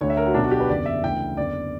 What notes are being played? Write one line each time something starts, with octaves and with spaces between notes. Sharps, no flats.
D2 D3 C#5
E5
A#4
F#4
B1 B2 D4
F#4
G4
B4
F#1 E2 D3 D5
E5
D2 C#3 E3 G5
F#1 E2 D3 D5